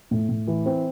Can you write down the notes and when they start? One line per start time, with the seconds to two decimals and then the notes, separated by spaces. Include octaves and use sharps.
0.11 A2
0.29 A2
0.47 E3
0.65 C4